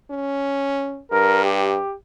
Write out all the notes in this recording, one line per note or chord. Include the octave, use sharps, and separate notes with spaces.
C#4
G2 A#4
G4